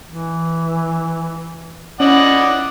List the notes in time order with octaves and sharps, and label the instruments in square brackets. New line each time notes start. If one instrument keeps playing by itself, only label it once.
[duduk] E3
[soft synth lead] C#4 [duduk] E4 [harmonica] D5 D#5 F#5